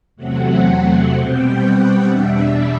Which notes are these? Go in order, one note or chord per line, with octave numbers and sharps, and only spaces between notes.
E2 C3 F#3 A3 C4 F#5
B2 G3 C4 G5
F#5
E2 B2 G3 D4 E5